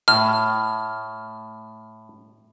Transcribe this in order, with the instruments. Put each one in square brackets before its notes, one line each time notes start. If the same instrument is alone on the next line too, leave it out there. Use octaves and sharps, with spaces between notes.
[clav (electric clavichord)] A2 [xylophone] F6